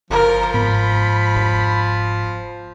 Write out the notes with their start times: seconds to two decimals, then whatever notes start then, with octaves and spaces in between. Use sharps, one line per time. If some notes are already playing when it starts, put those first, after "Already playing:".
0.10 G1 F3 A#4
0.54 G#2 B3 B5
1.35 F1